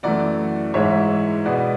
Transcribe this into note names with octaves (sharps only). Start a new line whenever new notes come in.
F#2 E3 A3 D5 F#5
G#2 E3 G#3 C#5 E5
B2 G#3 B3 D5 F#5